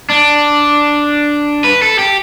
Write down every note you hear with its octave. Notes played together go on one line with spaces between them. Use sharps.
D4
B4
A4
G4